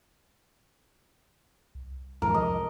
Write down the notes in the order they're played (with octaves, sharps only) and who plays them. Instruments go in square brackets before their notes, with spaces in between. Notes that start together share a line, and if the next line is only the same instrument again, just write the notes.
[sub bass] C2
[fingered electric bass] F2 G#2 E3 [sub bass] F3 [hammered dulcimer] A#4
[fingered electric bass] C2 [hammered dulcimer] D#5